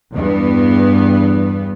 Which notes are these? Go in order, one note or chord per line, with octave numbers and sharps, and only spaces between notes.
E2 G2 B3